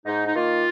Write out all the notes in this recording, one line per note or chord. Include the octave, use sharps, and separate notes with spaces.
G#2 D#4
D#4
D#3 A#3 F4